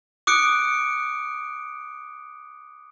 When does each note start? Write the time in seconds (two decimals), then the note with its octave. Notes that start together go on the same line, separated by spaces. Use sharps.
0.27 D6 D#6 F#6 C#7 D7